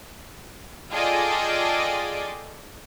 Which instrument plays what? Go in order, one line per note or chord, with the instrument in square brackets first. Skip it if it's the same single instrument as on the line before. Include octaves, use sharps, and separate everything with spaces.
[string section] F4 G#4 A4 D5 D#5 G5